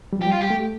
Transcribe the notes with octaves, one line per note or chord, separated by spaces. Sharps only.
G3
F3 G4
G3
F4
G4
A3